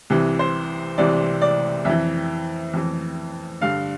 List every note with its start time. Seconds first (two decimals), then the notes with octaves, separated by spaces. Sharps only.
0.10 C2 C3 E3
0.39 C5
0.98 C2 C3 E3 D5
1.41 D5
1.85 F2 E3 E5
2.73 F2 E3
3.61 G2 D3 F5